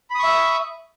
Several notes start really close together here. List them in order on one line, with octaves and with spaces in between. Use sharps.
B5 D#6 C#6 E5